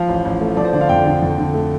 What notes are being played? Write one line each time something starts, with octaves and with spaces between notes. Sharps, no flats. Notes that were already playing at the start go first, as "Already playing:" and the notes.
Already playing: F3 F5
A1
A1
A3
F3 D5
C5
D3 D5
F5
F2 G5
D3
F2
D3
A3